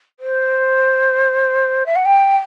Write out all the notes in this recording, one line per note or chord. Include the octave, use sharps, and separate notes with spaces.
C5
E5
F#5
G5